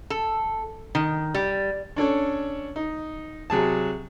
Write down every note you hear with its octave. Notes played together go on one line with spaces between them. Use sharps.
A4
D#3
G3
C#4 D4 A4 C#5
D#4
C3 F#3 G#4 A5